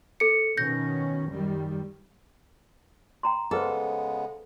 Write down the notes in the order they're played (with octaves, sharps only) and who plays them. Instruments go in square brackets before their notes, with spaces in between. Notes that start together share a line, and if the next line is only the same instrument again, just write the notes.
[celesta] A4 C#7
[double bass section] B2 D#3 C#4 [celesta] G6 A#6
[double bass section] F#2 D#3 G3
[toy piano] G5 A#5 C6
[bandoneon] C#3 G#3 B3 [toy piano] G#4 B4 C5 [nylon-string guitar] A4